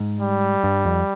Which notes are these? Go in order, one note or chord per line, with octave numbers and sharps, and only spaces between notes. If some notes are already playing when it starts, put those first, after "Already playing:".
Already playing: G#2
G3
G2
F2